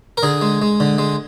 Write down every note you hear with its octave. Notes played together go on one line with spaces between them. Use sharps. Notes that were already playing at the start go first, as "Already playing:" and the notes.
A#4
D3 G#4
G#3
G#3
D3
G#3